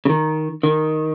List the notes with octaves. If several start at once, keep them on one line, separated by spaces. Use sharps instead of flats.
C#3
D#3
D#3